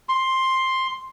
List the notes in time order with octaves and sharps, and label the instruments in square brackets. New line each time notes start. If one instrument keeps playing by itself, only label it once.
[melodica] C6